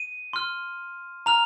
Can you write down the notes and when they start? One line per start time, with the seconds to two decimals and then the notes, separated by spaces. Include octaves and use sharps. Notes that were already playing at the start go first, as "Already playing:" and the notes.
Already playing: D#7
0.33 C6 F6
1.26 A#5 F6 F7